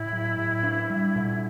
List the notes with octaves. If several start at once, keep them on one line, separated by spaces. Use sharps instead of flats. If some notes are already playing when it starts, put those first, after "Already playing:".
Already playing: A2 E4
F#3
A2
D4
G3
A#2